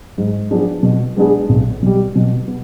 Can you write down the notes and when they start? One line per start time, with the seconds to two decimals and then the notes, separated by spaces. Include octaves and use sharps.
0.18 G#2
0.51 F3 B3 D4 G#4
0.83 B2
1.16 G#3 B3 D4 G#4
1.49 B1
1.83 B2 G3
2.16 B2
2.48 B3